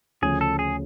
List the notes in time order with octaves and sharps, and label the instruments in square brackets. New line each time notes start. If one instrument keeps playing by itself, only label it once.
[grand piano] D2 C#3 F3 A3 C#4 [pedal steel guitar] G#4
[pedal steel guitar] A4
G#4